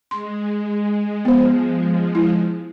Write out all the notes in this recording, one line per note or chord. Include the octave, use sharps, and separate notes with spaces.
G#3 C6
F3 G#3 B3 C5
E4